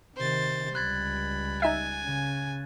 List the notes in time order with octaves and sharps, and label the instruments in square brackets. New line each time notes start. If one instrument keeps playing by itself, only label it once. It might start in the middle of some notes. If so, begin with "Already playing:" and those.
[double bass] C3 D#3 [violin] C5 A6
[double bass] C#2 G3 [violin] B5 [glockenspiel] F#6 G#6 A6
[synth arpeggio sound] D#4 E5 [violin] G#5
[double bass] C#3